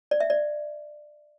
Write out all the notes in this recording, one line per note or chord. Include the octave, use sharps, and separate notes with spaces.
D5
E5
D5